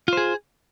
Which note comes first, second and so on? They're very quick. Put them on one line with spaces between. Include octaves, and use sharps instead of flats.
F4 C5 G#4